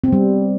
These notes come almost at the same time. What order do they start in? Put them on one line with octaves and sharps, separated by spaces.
C4 B3 G3